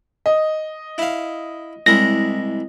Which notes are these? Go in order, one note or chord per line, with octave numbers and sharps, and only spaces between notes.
D#5
E4 F5
C2 G#3 E4 A#6